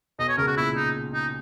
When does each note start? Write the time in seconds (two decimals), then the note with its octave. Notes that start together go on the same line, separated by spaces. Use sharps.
0.19 B1 B2 D#5
0.28 C#5
0.37 C#2 C#3 A#4
0.47 F#4
0.56 A#2 E4
0.76 D#4
1.13 D#4